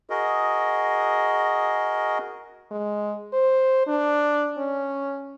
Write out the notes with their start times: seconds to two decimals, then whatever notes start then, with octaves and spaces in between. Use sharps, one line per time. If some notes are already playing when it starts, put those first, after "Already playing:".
0.10 F#4 G#4 A#4 D#5
2.71 G#3
3.33 C5
3.87 D4
4.58 C#4